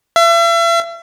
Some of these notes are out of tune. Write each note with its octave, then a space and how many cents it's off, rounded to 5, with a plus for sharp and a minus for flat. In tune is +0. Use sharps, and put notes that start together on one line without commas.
E5 +40